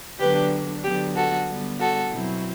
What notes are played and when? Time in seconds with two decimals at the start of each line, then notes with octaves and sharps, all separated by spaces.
0.19 D3 F#3 B3 D4 G4 B4
0.83 D3 F#3 B3 G4
1.15 F#4 A4
1.47 D3 G3 B3
1.80 F#4 A4
2.11 B2 F#3 C4 E4